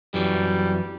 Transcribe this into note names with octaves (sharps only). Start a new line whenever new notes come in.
F#2 E3 F#3 G3